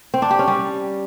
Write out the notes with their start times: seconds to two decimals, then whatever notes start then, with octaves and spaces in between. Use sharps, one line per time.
0.14 C4
0.22 D4
0.31 G4
0.39 C#4
0.48 G3